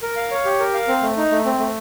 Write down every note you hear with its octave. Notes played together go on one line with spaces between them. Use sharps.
A#4
F5
C#5
G4
A#4
F5
C4
A3
D#4
A3
C4
A3